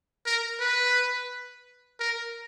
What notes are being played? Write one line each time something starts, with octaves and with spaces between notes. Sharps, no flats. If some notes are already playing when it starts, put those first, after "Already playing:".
A#4
B4
A#4